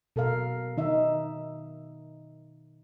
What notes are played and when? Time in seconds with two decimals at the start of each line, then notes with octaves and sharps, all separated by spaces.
0.16 B2 A4 A#4 F5
0.77 D#3 D#4 E5